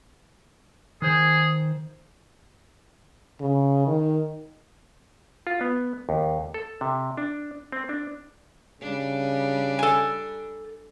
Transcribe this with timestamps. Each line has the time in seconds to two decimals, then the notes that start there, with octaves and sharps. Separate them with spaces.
1.02 D#3 G#4 C5
3.41 C#3
3.87 D#3
5.47 F4
5.61 B3
6.09 D#2
6.54 A4
6.81 C3
7.17 D4
7.72 C4
7.89 D4
8.81 C#3 G3 D4
9.79 A4 G#5